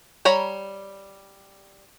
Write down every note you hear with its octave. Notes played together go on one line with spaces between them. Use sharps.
G3 C#5 A#5 B5